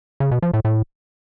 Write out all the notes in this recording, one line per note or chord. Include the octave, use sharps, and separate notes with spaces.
C#3
B2
F3
A2
A2